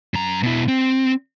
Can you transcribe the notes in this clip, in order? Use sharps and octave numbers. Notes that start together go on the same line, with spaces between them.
F#2 A#5
B2 E4
C4